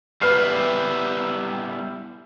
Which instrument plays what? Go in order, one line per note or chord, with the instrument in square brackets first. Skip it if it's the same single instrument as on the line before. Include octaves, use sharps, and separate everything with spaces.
[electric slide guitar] G3 B3 E4 [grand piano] B4 F6 C7